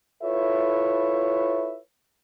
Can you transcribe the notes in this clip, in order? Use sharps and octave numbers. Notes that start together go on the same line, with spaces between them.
E4 F4 A4 B4 C#5 E5